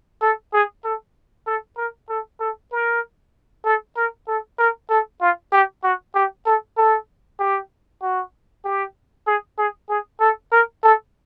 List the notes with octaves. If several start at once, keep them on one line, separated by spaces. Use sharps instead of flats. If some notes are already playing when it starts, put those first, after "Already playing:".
A4
G#4
A4
A4
A#4
A4
A4
A#4
A4
A#4
A4
A#4
A4
F4
G4
F#4
G4
A4
A4
G4
F#4
G4
G#4
G#4
G#4
A4
A#4
A4